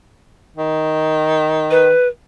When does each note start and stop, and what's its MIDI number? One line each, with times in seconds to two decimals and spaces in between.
0.57 1.91 51
1.71 2.08 71